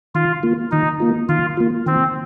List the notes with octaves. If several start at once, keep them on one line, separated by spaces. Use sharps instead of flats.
D#3 F4
A#3 F4
D#3 D#4
A#3 F4
D#3 F4
A#3 F4
D#3 C4